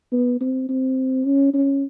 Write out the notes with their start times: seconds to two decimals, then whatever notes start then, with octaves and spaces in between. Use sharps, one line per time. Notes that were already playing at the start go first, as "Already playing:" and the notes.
0.12 B3
0.41 C4
0.69 C4
1.25 C#4
1.54 C#4